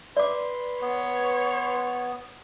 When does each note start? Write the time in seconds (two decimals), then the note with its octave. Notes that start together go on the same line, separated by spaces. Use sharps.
0.17 B4 D5 C6 D6
0.82 B3 C#5